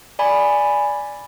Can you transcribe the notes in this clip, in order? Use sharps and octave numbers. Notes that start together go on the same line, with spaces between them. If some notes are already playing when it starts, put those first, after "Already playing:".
D5 G#5 B5